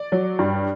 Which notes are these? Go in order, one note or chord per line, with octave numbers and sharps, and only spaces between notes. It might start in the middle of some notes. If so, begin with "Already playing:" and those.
Already playing: D5
F#3
G2